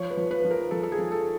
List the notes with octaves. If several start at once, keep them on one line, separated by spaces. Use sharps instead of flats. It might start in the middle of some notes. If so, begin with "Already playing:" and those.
Already playing: F3 C#5
B4
F3
B4
F3
A#4
F3 A4
A4
G#4
F3
A4